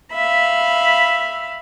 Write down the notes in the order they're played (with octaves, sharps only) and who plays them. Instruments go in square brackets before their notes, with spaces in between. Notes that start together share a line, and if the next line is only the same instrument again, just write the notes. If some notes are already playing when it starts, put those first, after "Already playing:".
[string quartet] E5 F5 B5